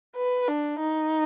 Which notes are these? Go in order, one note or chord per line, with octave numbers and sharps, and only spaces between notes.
B4
D4
D#4